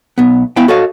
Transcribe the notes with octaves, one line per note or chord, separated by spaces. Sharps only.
B1 B3
B3 E4 E5 F5 G5
F#4 A4 C#5 D#5 F5